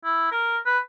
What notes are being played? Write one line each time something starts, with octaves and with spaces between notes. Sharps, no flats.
E4
A#4
B4